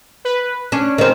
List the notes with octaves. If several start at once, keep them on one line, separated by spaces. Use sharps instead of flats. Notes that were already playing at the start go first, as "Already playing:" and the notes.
B4
C#4 D4
D#3 C4